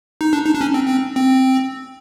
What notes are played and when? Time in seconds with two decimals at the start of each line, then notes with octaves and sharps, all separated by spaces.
0.21 D#4
0.33 D4
0.46 D#4
0.55 D4
0.61 C#4
0.74 C4
0.88 C4
1.16 C4